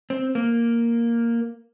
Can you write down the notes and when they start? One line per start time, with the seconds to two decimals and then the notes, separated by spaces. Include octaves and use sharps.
0.10 C4
0.35 A#3